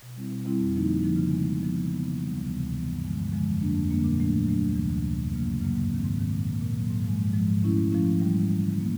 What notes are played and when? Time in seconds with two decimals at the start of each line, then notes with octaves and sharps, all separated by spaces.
0.03 B2
0.16 G3 C4 E4
0.31 B2
0.46 G3 C4 E4
0.60 F2
0.74 D3 F3 A#3 D#4
0.89 F2
1.02 D3 F3 A#3 D#4
1.16 C#3
1.31 F3 G#3 B3
1.46 C#3
1.60 F3 G#3 B3
1.74 C#3
1.89 E3 G3 B3
2.02 C#3
2.17 E3 G3 B3
2.32 D2
2.46 C3 E3 G3 B3
2.61 D2
2.74 C3 E3 G3 B3
2.89 G2
3.04 D3 F3 G#3
3.18 G2
3.32 D3 F3 G#3
3.46 F2
3.61 D3 G3 A#3 D4
3.75 F2
3.89 D3 G3 A#3 D4
4.04 A#2
4.18 F#3 A3 D4
4.33 A#2
4.46 F#3 A3 D4
4.61 D2
4.75 C3 E3
4.90 D2
5.03 C3 E3
5.18 F#2
5.33 C#3 F#3 A#3
5.47 F#2
5.61 C#3 F#3 A#3
5.76 G#2
5.90 D#3 G#3 C4
6.04 G#2
6.18 D#3 G#3 C4
6.33 A#2
6.48 F#3 A#3
6.61 A#2
6.76 F#3 A#3
6.90 G#2
7.04 F3 G#3
7.19 G#2
7.33 F3 G#3
7.47 G#2
7.62 F3 A3 C#4 E4
7.76 G#2
7.90 F3 A3 C#4 E4
8.05 G#2
8.19 E3 G3
8.33 G#2
8.48 E3 G3
8.62 D3
8.77 F#3 A#3